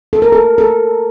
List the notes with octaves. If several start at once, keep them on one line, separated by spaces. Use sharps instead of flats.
A4
A#4
A4
A4